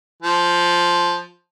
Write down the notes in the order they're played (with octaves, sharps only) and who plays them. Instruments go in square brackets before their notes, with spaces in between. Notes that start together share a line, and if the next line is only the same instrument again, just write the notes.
[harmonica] F3